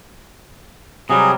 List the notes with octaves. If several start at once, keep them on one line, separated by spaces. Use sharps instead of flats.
C3 F#3 G3 G#4